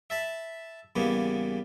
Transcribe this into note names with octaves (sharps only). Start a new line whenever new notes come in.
E5 A5 B5
E2 C#3 G3 A#3 B3